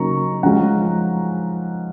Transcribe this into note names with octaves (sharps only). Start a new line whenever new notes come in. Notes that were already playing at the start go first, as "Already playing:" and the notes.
Already playing: C#3 F#3 A#3 D#4 A#5 C#6
F3 G#3 C#4 F#5 A#5